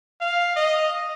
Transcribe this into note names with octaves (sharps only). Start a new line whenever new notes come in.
F5
D#5